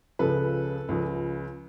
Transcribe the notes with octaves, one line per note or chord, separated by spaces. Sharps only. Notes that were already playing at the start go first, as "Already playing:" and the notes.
C#2 C#3 F3 A4 B4
C#2 C#3 F3